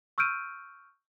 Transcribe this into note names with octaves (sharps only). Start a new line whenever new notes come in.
C#6 E6 F6 G6 D7 D#7